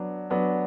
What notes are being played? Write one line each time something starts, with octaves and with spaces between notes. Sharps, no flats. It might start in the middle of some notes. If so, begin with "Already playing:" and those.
Already playing: F#3 B3 D4
F#3 B3 D4